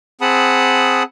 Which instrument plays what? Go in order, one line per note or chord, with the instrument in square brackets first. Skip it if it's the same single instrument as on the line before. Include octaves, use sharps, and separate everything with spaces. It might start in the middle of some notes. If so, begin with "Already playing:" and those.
[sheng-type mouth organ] C4 G#4 F#5 A5 B5 D#6